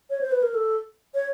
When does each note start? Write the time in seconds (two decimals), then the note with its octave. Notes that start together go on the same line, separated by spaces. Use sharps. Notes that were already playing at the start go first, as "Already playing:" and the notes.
0.10 C#5
0.21 C5
0.32 B4
0.43 A#4
0.54 A4
1.14 C#5